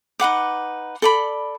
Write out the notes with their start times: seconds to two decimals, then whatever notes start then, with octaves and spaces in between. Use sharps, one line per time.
0.20 D#4 B4 F#5 D6
1.02 A4 D5 B5